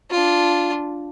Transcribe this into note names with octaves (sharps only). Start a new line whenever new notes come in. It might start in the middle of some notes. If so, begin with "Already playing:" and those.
D4 F4